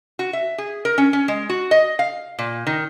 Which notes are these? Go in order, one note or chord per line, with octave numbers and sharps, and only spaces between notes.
F#4
E5
G#4
A#4
C#4
C#4
G#3
F#4
D#5
F5
A#2
D#3